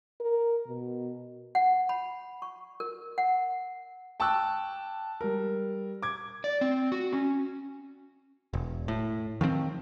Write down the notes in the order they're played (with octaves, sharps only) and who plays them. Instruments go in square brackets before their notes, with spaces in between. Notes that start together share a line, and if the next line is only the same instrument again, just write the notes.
[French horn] A#4
B2
[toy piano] F#5
B5
C#6
A#4
F#5
[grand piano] G5 A5 C#6 D6 E6 F#6
G3 A#4
D6 G#6
[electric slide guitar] D5
C4
F#4
C#4
[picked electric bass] E1
A2
D#3 F3 G3 C4